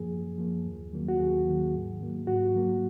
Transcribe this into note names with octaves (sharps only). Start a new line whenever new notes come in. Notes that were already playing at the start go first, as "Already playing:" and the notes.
Already playing: F#2 F3 A#3 G#4
F#2
F3 A#3
D#2
D#3 F#3 A#3
F#4
D#2 G#4
D#3 F#3 A#3
G#2
F#3 A#3
G#2 F#4
F#3 A#3